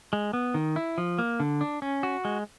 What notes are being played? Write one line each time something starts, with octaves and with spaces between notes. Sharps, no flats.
G#3
B3
D#3
E4
F3
A#3
D3
D4
C#4
F#4
G#3